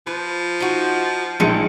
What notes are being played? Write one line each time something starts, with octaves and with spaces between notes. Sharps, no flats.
F3 B4
D#4 F#4
A#1 D#3 G#3 C#7